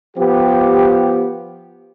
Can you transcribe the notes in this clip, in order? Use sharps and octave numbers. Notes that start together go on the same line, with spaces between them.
F3 B3 G4